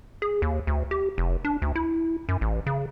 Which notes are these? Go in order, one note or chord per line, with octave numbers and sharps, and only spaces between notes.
G#4
D#2
D2
G4
F1
D4
D2
E4
F#2
A1
C#3